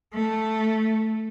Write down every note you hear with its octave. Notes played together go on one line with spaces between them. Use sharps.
A3